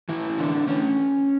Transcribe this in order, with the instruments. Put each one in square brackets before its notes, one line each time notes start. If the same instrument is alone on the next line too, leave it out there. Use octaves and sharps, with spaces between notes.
[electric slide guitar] A2 E3 E4
A2
D3 D4
E3
A3 C#4